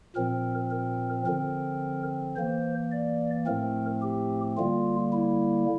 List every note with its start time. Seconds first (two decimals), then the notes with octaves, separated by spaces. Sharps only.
0.15 A#2 F3 C4 A#4
0.70 A#4
1.25 D3 F3 C4 A#4
2.36 E3 A#3 C5
2.92 D5
3.46 A2 F3 A3 C4 A#4
4.02 G4
4.57 D3 G3 A#3 F4
5.12 E4